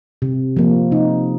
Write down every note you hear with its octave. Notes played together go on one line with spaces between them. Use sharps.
C3
F3 A#3
C3 D#4